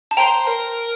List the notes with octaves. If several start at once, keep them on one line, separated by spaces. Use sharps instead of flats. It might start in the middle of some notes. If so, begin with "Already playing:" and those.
A5
C5 G5 A#5
A#4